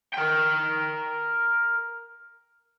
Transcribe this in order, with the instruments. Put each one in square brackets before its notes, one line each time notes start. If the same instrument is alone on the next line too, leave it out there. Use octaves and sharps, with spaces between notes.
[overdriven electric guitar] A#4 G5